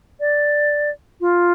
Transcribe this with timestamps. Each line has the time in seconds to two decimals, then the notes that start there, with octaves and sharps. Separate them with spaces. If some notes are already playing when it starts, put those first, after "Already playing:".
0.20 D5
1.21 F4